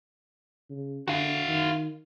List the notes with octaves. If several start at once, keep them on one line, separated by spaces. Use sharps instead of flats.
C#3
D3 F#4 F5
D#3